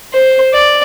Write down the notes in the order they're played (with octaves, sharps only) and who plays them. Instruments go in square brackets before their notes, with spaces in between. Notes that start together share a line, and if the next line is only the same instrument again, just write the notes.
[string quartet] C5
D5